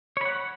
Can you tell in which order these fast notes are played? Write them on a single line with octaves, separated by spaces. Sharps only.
C#5 B5 F#5